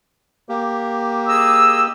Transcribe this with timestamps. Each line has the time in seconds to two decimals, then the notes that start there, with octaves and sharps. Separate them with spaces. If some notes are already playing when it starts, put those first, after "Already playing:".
0.49 A#3 G4
1.28 G#4 D#5 E6